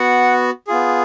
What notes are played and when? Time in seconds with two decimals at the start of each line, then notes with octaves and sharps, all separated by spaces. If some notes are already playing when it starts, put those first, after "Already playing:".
Already playing: B3 F#4 F#5
0.67 B3 F4 G#4